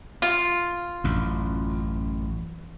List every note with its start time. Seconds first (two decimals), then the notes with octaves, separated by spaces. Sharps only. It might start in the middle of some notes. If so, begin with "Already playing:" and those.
0.22 F4
1.04 A1 F#2